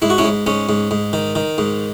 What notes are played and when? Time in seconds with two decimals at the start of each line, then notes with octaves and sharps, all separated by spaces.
0.02 G#2 E4
0.10 F#4
0.18 C#4 E4
0.24 G#2
0.46 G#2 C#4
0.69 G#2
0.91 G#2
1.13 D#3
1.36 D#3
1.58 G#2